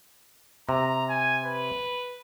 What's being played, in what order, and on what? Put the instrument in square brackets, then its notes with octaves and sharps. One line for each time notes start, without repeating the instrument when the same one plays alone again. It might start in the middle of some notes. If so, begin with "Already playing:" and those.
[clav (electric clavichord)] C3 [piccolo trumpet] A#5
[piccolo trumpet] G#5
B4